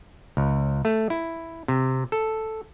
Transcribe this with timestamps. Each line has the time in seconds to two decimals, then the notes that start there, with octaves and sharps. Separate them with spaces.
0.37 C#2
0.85 A3
1.10 E4
1.68 C3
2.12 A4